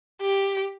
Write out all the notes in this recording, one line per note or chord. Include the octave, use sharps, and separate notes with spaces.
G4